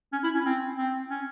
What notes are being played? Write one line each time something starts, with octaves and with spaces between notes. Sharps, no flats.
C#4
E4
C#4
C4
C4
C#4